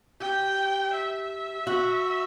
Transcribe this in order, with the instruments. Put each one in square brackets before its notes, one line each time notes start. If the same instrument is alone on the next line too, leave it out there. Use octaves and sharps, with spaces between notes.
[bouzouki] G4 [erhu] G5
[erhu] E5
[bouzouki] F#4